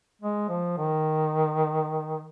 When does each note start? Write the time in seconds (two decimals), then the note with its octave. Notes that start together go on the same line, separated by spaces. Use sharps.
0.22 G#3
0.49 F3
0.78 D#3